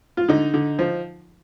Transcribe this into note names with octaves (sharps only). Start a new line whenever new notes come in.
F4
D3 D#4
D3
F3